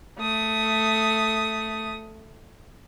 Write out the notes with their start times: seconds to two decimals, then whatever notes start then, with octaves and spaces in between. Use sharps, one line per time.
0.18 A3 D#6